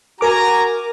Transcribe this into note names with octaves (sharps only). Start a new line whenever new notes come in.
F#4 A#4 G#5 A#5 D6